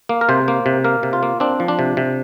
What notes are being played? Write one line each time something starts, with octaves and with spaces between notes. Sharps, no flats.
A#3
A#4
C3 C5
A#3
C3
A#3 A#4
C3
F4
A#3
C4 D4
F3
D4
C3
C3